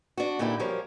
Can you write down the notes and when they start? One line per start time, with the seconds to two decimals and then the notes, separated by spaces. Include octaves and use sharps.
0.17 D4 F#4
0.39 A#2 D3 D#4 E4 G4
0.59 F#2 F3 G3 A#4 C#5